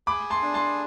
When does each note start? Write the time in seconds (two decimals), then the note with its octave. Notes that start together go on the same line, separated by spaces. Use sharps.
0.07 G#4 B5 D6
0.30 A5 C6
0.42 D4
0.54 A5 C6